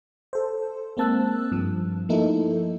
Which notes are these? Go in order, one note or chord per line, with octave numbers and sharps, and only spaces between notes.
A4 C5
G#3 A#3 C4 A5 E6 F#6
G2 F3
F3 A3 A#3 D#4 E4 A4